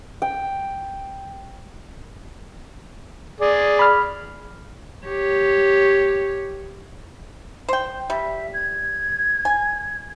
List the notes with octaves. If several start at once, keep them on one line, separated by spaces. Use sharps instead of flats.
G5
G#4 D5
B5 F6
G4 C#5
C5 G5
G3 E5
G#6
G#5